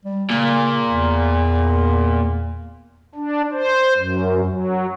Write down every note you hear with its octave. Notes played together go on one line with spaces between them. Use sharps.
G3
A#2 C#3
E2
D4
C5
F#2
F#3